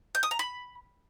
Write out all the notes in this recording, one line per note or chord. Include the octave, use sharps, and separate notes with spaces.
G6
D#6
A#5
B5